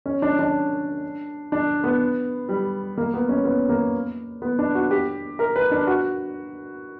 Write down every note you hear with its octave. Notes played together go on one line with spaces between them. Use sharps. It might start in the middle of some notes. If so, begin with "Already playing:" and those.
C#4
D4
D4
D4
B3
G3
A#3
B3
C#4
B3
A#3
B3
D4
F#4
G4
A#4
B4
D4
F#4